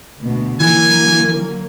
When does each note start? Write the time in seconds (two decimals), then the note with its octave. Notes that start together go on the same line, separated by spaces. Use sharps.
0.20 D2 B2
0.60 D3 E3 F#3 A#3 G#5